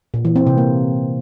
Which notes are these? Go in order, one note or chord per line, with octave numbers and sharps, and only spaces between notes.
A#2
E3
C4
C3
A#3